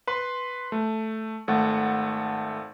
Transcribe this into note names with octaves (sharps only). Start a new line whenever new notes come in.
B4 C6
A3
G#1 A3 F#5 A6